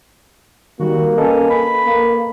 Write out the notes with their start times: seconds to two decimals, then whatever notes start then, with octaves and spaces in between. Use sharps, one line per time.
0.80 D#3 G3 A#3 F#4
1.17 C#4 A4 B4 D#5
1.50 B5
1.87 A#3